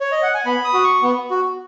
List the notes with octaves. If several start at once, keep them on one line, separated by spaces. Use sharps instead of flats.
C#5
D#5
F#5
G#5
B3 B5
D#6
F#4
C#6
B3
F#4